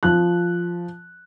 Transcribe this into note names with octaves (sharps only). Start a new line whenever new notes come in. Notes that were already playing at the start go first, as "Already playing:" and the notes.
F3 F#6